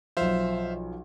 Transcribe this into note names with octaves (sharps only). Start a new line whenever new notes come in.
B1 F3 C5 E5 F5